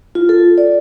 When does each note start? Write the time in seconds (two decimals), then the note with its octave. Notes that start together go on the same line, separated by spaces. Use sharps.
0.15 F4
0.29 A4
0.58 D5